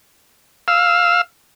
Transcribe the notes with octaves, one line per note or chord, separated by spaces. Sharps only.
F5 E6